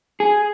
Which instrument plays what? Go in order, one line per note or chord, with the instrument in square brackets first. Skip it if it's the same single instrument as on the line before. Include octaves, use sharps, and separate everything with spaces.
[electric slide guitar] G#4